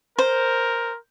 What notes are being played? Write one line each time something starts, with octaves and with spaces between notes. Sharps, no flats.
A#4 C5